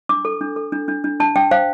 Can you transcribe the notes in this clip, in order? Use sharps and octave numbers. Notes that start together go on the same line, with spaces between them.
D4 D6
A4
D4
A4
D4
D4
D4
D4 A5
D4 G5
C5 F5